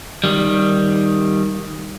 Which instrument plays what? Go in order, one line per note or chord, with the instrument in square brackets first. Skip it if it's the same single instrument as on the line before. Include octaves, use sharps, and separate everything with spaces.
[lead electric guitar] D#3 G3